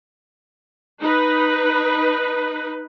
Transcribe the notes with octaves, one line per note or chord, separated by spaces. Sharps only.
D#4 B4